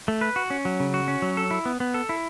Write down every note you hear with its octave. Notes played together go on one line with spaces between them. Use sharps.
A3
B4
F#4
C#4
F#3
C#3
F#4
C#4
F#3
A4
E4
B3
B3
A4
E4